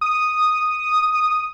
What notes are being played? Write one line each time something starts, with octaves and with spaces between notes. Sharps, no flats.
D#6